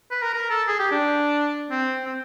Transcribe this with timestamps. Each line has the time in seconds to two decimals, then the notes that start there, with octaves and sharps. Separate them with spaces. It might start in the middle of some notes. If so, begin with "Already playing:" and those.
0.11 B4
0.22 A#4
0.34 A#4
0.50 A4
0.68 G#4
0.79 G4
0.91 D4
1.71 C4
2.05 C4